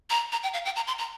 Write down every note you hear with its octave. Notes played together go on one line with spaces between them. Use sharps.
A#5
A#5
G5
F5
G5
A#5
C6
A#5